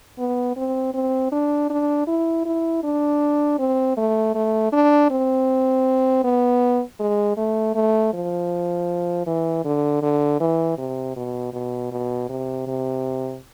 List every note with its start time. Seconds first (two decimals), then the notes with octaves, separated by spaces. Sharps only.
0.19 B3
0.56 C4
0.94 C4
1.32 D4
1.70 D4
2.07 E4
2.45 E4
2.83 D4
3.59 C4
3.97 A3
4.35 A3
4.73 D4
5.11 C4
6.24 B3
6.99 G#3
7.37 A3
7.75 A3
8.13 F3
9.26 E3
9.65 D3
10.02 D3
10.40 E3
10.78 C3
11.16 B2
11.53 B2
11.92 B2
12.29 C3
12.67 C3